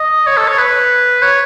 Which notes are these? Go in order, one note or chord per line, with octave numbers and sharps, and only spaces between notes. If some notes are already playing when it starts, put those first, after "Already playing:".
Already playing: D#5
C#5
A4
C#5
B4
C#5